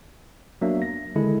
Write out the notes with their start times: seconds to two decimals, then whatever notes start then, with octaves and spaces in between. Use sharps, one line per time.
0.61 F#3 A#3 B3 D4 E5
0.82 A#6
1.15 D3 D#3 G#3 E4 A4